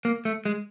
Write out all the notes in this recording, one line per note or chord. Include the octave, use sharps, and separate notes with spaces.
A#3
A3
G#3